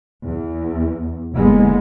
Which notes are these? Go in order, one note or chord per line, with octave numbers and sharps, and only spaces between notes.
E2
F#1 D3 G#3 A#3 B3